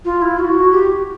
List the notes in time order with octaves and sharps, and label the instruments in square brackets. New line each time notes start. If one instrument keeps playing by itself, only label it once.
[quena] F4
E4
F#4
G4